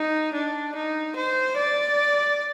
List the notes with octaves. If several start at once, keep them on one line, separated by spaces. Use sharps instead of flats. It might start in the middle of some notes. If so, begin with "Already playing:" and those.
Already playing: D#4
D4
D#4
C5
D5